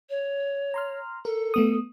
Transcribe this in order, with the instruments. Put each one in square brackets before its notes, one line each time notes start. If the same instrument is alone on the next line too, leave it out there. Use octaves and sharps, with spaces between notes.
[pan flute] C#5
[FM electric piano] A#5 C6 F6
[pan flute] A4 [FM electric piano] A#4
[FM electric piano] A3 B3 D#6